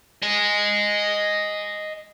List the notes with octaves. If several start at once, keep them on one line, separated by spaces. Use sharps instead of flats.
D#5 G#5